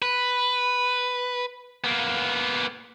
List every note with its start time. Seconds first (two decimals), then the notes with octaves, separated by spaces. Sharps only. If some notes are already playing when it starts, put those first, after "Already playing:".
0.02 B4
1.84 A#3 B3